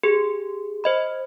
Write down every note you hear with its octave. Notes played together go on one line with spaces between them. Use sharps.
G4 G#4 C6
C5 D#5 B5